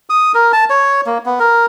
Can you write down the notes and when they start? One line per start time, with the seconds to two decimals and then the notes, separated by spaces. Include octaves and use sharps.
0.10 D#6
0.34 A#4
0.53 A5
0.70 C#5
1.06 A#3
1.26 B3
1.40 A#4